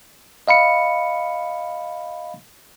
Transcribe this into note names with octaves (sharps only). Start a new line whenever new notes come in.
D#5 F5 B5 C#7